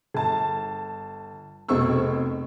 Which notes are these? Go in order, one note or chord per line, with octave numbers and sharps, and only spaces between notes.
G1 A5
F1 B2 C4 G#4 C#6 E6